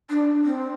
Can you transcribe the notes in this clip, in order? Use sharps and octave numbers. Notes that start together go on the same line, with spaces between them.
D4
C4